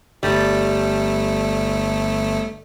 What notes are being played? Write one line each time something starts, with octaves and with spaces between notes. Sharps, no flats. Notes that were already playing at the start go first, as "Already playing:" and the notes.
G1 G3 A3